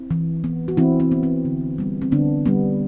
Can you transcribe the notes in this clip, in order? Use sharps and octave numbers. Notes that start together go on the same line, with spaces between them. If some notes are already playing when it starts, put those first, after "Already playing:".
Already playing: C4 E4
E3
B3
F#4
E3 C4 E4
C4
B3
C4
D3
G3 B3
C4
D3 B3 D4
G3 B3